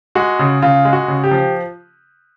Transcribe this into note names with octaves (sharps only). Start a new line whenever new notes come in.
G#3 F#4
C#3
C#3 F4
G#3
F#4
C#3
G4
F3